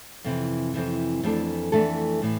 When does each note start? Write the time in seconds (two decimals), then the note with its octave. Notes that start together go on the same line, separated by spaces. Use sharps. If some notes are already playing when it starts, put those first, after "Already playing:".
0.24 F2 C3 E3
0.74 F2 C3 E3
1.23 F2 E3 A3 D4 A4
1.72 F2 E3 A3 D4 A4
2.22 A2 E3